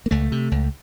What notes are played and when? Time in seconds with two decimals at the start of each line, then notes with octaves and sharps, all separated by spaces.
0.06 A#3
0.11 C#2 A3
0.32 C3
0.51 C#2